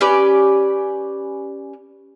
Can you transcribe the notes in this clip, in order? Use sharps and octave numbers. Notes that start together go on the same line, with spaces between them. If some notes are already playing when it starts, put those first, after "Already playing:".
C#4 G4 B4 D5